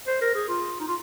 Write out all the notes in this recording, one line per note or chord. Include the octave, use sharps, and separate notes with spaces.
C5
A#4
G#4
F4
D#4
F4